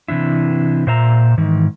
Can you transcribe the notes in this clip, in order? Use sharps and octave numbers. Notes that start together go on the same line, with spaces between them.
C3 E3 D4 E4
A#2 C5 E5 A#5
G#2 D#3 E3